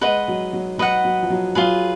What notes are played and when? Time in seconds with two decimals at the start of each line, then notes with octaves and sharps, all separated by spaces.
0.01 G#3 B4 D#5 F#5
0.28 F#3
0.53 F#3
0.78 F#3 B4 D#5 F#5
1.05 F#3
1.23 F3
1.30 F#3
1.55 F#3 F4 G#4 B4